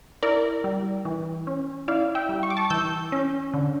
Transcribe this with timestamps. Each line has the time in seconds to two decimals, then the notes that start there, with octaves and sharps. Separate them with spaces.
0.23 E4 A#4 D5
0.64 G3
1.05 E3
1.47 C#4
1.88 E4 D5 F5
2.15 E5 G5
2.29 G3
2.43 C#6
2.50 D6
2.57 A5 C#6
2.70 E3 E6 G6
3.12 C#4
3.54 D3